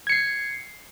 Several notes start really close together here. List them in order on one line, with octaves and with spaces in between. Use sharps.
G#6 C#7 C7